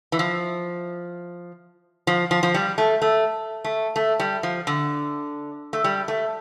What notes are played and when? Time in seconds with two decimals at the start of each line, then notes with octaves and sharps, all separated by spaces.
0.12 E3
0.19 F3
2.07 F3
2.31 F3
2.43 F3
2.54 G3
2.78 A3
3.02 A3
3.64 A3
3.96 A3
4.19 G3
4.43 F3
4.67 D3
5.73 A3
5.84 G3
6.08 A3